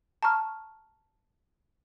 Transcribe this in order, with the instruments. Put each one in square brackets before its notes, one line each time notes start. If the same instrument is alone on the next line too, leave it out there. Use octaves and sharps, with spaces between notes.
[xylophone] A5 A#5 C#6 F6